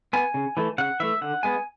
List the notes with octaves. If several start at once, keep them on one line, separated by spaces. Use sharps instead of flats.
B3 G#5
C#3
E3 A3
C#3 F#5
E3 A3 E5
D3 F#5
G#3 B3 G#5